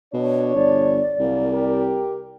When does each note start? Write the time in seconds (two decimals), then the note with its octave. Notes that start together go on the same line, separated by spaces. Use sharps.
0.14 B2 D4 C#5
0.55 G1 D5
1.19 C2 F#3 A#3
1.53 G4 A#4